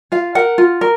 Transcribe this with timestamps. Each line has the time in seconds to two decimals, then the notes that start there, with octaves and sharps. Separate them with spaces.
0.12 F4 F5
0.35 A#4 F#5
0.58 F4
0.81 A#4